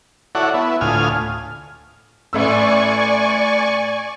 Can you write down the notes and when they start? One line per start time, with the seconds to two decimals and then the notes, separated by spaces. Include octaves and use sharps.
0.35 E4 F#4 A4 C#5 D5 F#5
0.54 B3 E4
0.81 D2 A2 F4 G#5 D#6 F6
2.33 A1 A3 D5 G#5 C#6 E6